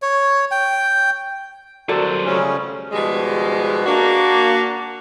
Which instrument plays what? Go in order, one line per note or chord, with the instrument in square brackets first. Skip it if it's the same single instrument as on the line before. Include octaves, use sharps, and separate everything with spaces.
[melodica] C#5
G5
[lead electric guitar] F#3 C5 [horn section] G3 C4 A#4 [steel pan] F#4 A4 D5
[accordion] C#3 G3 C#4 [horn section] F3 A3
[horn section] B2 D#3 F3 G3 G#3
A#3 D4 F#4